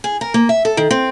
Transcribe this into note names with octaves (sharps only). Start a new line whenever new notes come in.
G#4
A#4
A#3
E5
A4
D#3
C4